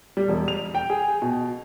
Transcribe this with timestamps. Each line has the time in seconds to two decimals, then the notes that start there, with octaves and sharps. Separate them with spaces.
0.17 G3
0.28 E1
0.48 F7
0.75 G5
0.90 G#4
1.22 B2